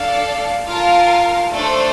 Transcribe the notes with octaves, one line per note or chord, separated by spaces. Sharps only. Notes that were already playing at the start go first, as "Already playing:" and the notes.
Already playing: D4 A4 D5 F5 A5
F4 A#4 F5 A5
A3 D4 A4 C5